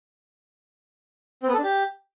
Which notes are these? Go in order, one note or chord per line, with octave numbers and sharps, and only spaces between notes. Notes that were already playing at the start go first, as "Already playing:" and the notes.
C4
B3
A4
D4
G4